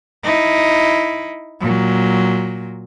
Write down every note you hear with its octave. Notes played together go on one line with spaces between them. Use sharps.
D#4 E4
A#2 F#3